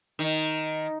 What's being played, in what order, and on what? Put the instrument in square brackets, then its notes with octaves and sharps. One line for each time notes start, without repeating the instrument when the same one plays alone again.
[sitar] D#3